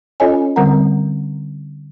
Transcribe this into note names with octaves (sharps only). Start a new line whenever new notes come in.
C#4 F4 A4 C#5 D#5 G#5
D3 G3 C4 A#4 F#5 A#5